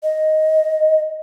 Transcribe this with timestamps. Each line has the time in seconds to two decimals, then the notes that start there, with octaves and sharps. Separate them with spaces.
0.03 D#5